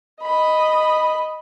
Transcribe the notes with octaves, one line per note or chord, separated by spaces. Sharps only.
D#5 B5